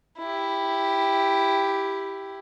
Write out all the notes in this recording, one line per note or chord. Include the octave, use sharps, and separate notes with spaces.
E4 G4